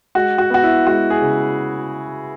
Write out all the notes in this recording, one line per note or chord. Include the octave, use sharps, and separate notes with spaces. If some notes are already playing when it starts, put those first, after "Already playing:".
G#3 F#4
F#4
B3 F#4
E4
G#3 F#4
G#4
C#3